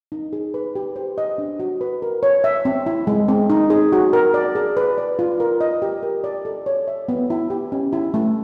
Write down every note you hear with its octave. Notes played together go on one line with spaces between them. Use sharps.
D#4
G#4
B4
G4
C5
D#5
D4
F#4
B4
A#4
C#5
E5
C4
E4
G#3
C4
D#4
G#4
F#4
A#4
D5
G#4
B4
D5
F4
A#4
D#5
G4
A#4
D5
A4
C#5
E5
B3
E4
G4
C#4
E4
A3